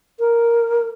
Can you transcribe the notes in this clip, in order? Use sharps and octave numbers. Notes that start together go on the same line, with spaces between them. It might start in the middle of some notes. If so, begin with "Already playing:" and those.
A#4